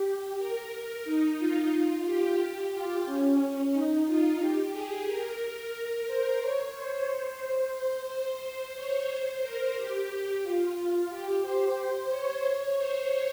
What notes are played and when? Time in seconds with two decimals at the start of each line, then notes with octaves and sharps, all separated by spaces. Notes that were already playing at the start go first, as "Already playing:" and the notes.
Already playing: G4
0.38 A#4
1.05 D#4
1.38 F4
2.05 G4
2.73 F4
3.06 C#4
3.39 C#4
3.73 D#4
4.06 F4
4.40 G4
4.73 G#4
5.06 A#4
6.07 C5
6.40 C#5
6.75 C5
7.75 C5
8.08 C5
8.75 C#5
9.09 C5
9.42 A#4
9.76 G4
10.43 F4
11.10 G4
11.42 C5
11.76 C5
12.10 C#5
12.77 C5